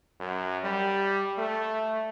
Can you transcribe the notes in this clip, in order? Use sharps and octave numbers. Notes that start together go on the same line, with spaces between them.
F#2
G3
A3